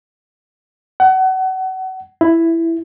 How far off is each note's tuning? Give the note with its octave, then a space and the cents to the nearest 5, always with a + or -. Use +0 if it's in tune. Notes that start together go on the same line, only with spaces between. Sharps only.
F#5 +30
E4 +5